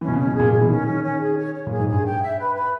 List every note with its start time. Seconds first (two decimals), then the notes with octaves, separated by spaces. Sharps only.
0.01 E3 C#4
0.08 B2
0.14 C#3 C#4
0.27 B2
0.35 A#2 G#4
0.51 B2 G#4
0.61 E3
0.69 D#3 C#4
0.86 D#3 C#4
1.03 C#4
1.20 G#4
1.36 C#5
1.54 C#5
1.67 A#2 G#4
1.79 G#2
1.87 G2 G#4
2.04 G5
2.22 E5
2.39 B4
2.55 B4